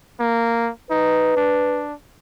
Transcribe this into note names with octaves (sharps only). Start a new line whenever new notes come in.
A#3
D#4 B4
D4